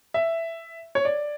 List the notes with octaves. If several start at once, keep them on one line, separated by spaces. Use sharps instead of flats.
E5
C#5
D5